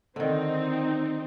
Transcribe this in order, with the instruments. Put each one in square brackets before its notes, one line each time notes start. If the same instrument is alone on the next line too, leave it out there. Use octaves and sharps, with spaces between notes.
[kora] D3 D#3 [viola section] C4 D#4